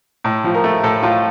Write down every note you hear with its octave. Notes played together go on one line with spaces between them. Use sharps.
A2
F3
A#4
A3
A2 A4
A2 F4